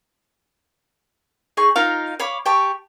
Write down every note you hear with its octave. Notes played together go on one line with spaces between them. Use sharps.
D#4 G#4 C#6
D#4 F4 A#4 F5
C#5 F5 B5 D6
G4 G5 A5 C#6